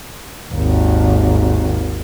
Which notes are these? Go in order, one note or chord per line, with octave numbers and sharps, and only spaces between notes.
G#1 D#2